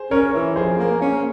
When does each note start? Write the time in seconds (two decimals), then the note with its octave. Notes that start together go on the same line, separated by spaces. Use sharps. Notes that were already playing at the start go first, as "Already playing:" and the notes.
Already playing: G#4 C5
0.11 C#4 A#4 C#5
0.34 E3
0.56 F2 G#4 C5
0.79 A#3
1.02 C#4